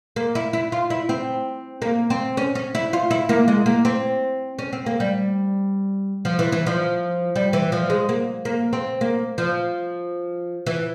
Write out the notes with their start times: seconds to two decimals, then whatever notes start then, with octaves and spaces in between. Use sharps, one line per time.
0.16 A#3
0.35 E4
0.53 E4
0.72 F4
0.90 E4
1.09 C4
1.82 A#3
2.10 C4
2.37 C#4
2.55 C#4
2.75 E4
2.93 F4
3.11 E4
3.29 A#3
3.48 G#3
3.66 A#3
3.85 C4
4.59 C#4
4.73 C4
4.86 A#3
5.00 G3
6.25 F3
6.39 E3
6.52 E3
6.66 F3
7.36 G3
7.53 E3
7.72 F3
7.90 G#3
8.09 A#3
8.45 A#3
8.73 C4
9.01 A#3
9.38 F3
10.66 E3